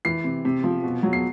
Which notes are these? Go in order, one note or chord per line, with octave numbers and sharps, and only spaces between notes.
E3 C7
C3
C3
F3
B2
F#3
C7